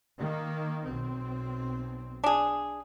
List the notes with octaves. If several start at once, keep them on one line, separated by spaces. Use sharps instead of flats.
D#3 A#3
B1 C4
D4 G#4